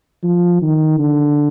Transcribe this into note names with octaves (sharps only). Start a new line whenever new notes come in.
F3
D#3
D3